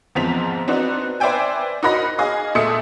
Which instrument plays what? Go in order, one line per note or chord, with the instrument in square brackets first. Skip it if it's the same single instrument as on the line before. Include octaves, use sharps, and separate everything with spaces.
[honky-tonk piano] E2 G#2 F3 C4 B6 F7
B3 C4 D4 D#4 F#4
B4 C5 D5 E5 G5 G#5
D#4 F#4 A#4 D#5 B5 A#6
G#4 D#5 F5
A#2 A3 E5 D#6 C#7